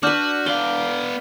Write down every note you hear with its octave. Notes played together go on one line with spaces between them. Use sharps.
D4 F#4 B4 D6 F6 G6
B3 D5 F5 G7